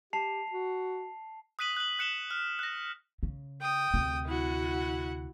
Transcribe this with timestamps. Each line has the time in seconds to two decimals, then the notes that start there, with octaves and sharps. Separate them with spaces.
0.13 G4 A5 C7 F7
0.52 F#4
1.59 D#6 F#6 B6 D#7 F#7
1.77 F#6 F#7
1.99 F#6 C#7 E7 F#7 G7
2.31 F6
2.59 F#6 A#6
3.23 C#3
3.61 G5 D#6
3.94 D2 C3
4.26 E4 F#4 F#5